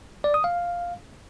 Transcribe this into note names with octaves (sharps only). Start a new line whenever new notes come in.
D5
D#6
F5